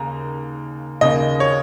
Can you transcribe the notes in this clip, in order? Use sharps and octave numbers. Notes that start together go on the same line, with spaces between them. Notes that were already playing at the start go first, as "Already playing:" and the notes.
Already playing: D#2 C#3 A#3 A#5
D#2 C#3 A#3 D#5
C#5